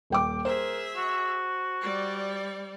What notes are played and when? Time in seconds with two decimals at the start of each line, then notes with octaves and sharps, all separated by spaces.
0.10 D#1 G5 D6
0.45 G#4 A#4 C5 E5
0.97 F#4
1.81 G3 D5